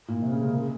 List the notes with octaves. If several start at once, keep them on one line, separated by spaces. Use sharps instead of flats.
A#2
C3
C#3
G#3
A#3